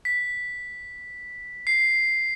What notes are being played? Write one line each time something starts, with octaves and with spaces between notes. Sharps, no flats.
B6
C7